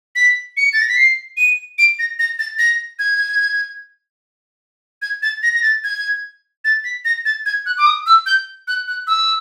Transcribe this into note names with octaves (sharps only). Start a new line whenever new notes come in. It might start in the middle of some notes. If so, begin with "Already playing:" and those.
B6
C#7
A6
A#6
B6
C7
D#7
D7
A#6
A#6
A6
A#6
G#6
G#6
A6
A#6
A#6
A6
G#6
A6
B6
A#6
A6
G#6
F#6
D6
D#6
E6
G6
F#6
F#6
E6